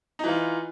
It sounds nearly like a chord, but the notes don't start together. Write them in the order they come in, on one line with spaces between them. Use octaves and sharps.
D#4 E3 F4